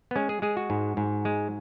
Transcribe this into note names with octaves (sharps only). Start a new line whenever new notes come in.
B3
G#3 C#4
G#4
G#3 G#4
F#4
G#2
G#2
G#3